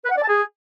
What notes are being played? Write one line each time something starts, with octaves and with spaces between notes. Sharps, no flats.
B4
F#5
D5
A5
G#4